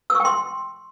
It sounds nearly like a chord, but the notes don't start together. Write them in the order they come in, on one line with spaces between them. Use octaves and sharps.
E6 C#6 G5 C6